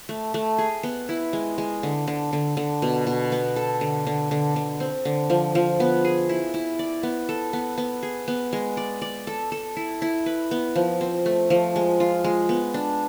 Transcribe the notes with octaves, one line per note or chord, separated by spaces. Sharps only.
A3
A3
G#4
B3
E4
G#3
G#3
D3
D3
D3
D3
B2
B2
B3
A4
D3
D3
D3
D3
C4
D3
F3
F3
B3
G#4
E4
E4
D5
B3
A4
B3
B3
G#4
B3
G#3
D5
D5
A4
A4
E4
E4
B4
B3
F3
C4
A3
F3
G#3
F4
G#3
B3
D4